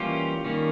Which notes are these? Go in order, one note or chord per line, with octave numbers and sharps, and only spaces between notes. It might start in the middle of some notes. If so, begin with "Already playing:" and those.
Already playing: E3 G3 A#3 C#4 F4 G4
D#3 G3 A#3 C#4